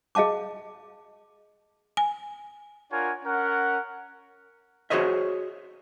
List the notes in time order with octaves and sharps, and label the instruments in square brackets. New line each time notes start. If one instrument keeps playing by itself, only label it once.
[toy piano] G#4 D#5 F5 A5 D6
[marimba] G#5
[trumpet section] D4 F4 A#4 C#5 F#5 G#5
C#4 A#4 F#5
[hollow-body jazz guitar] F#4 G#4 C5 C#5 D#5 E5